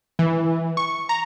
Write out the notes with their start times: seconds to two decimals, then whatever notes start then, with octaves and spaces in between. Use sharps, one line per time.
0.19 E3
0.77 C#6
1.09 A#5